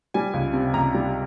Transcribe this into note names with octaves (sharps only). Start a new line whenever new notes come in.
G3 G#5
C#2
C3
C#2 A#5
G3